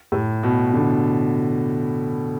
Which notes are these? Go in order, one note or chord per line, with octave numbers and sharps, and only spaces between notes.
A2
B2
D3